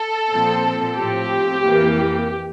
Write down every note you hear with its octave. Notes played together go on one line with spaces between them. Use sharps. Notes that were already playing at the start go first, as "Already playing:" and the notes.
Already playing: A4
A#2 F3 C4
A2 F3 C4 G4
F2 E3 A#3